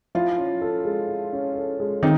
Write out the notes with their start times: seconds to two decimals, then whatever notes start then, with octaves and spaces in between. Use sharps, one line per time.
0.15 F3 E4 F4
0.38 C#4
0.61 A4
0.85 G#3
1.08 E4
1.33 C#4
1.55 A4
1.80 G#3
2.03 D#3 C4 D#4